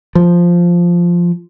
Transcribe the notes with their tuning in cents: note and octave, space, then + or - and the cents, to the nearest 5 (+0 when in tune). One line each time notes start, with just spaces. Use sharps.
F3 -5